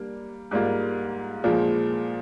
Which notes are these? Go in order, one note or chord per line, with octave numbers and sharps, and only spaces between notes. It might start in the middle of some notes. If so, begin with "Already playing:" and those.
Already playing: G3 A#3 D4
G#2 G3 A#3 F4
A#2 F3 G#3